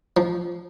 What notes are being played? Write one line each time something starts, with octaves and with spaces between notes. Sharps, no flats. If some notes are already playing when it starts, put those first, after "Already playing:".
F3